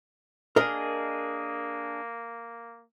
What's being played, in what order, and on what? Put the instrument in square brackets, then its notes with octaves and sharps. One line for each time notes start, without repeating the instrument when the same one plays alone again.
[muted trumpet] A#3 [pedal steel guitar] D4 G#4 [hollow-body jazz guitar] A#4 D#5